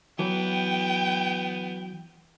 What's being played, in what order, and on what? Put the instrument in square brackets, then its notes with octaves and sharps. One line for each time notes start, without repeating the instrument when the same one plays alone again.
[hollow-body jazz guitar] E3 F#3 [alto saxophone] B3 [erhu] G5